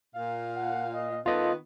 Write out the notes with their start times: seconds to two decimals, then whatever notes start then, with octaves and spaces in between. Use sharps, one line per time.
0.15 A#2 F5
0.56 F#5
0.93 D#5
1.26 D#3 B3 F4 A4 D#5